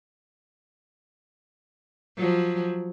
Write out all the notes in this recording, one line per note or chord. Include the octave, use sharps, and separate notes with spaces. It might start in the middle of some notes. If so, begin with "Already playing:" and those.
F3 F#3